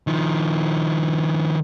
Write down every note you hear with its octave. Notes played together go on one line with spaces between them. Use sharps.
D#3 F3